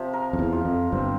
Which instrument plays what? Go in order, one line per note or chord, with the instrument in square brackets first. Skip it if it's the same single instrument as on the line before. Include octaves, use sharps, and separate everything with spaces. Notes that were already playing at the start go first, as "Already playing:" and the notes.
Already playing: [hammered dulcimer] C3 F3
A#4
[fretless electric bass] F2
E2
[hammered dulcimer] F4
[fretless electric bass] F2
[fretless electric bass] G1 G2 [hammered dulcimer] C4